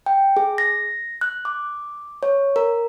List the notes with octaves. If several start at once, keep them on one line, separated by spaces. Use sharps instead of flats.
G5
G#4
A#6
F#6
D6
C#5
A#4